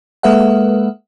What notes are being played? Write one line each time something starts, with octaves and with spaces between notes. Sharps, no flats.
G#3 A#3 A4 B4 E5 F#5